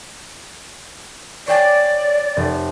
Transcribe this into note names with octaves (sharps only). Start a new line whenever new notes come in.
C#5 D5 G5 G#5
F1